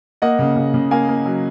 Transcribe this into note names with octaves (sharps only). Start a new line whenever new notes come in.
A#3 D#5 F#5
C#3
C#3
C#3
A#3 F5 G#5
A#3
F#3